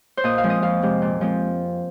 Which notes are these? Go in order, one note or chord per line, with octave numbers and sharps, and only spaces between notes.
C5
A#2 D#5
F5
F3 G#3 C4
D#5
F2 F5
C3 G#3 C4
A#2
F3 G#3 C4